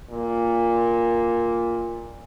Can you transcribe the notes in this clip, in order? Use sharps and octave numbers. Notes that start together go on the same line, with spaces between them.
A#2